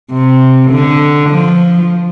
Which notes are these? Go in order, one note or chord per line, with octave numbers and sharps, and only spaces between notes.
C3
D3
F3